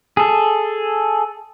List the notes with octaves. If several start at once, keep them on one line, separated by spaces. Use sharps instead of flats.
G#4 A4